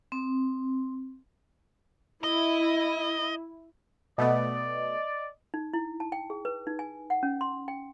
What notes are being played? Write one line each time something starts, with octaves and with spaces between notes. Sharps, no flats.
C4
E4 D#5
B2 A3 B3 D5 D#5
D#4
E4
A5
G5
G#4
B4
D#4
G#5
F#5
C#4
C6
G5